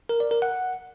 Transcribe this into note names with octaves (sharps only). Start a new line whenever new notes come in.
A#4
D5
A#4
F#5